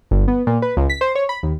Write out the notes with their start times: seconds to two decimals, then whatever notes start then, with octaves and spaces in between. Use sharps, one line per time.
0.11 G1
0.28 B3
0.47 A#2
0.62 B4
0.77 C#2
0.90 B6
1.01 C5
1.15 C#5
1.29 B5
1.43 D#2